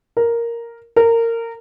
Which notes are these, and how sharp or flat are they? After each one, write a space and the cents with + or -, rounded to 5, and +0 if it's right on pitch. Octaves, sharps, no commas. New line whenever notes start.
A#4 +0
A#4 -20